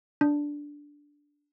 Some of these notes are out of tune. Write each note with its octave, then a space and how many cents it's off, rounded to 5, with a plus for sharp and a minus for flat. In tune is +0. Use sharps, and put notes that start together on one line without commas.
D4 -5